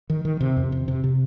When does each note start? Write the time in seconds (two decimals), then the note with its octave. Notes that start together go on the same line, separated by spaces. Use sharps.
0.10 D#3
0.25 D#3
0.41 C3
0.57 F2
0.72 C3
0.88 C3
1.04 C3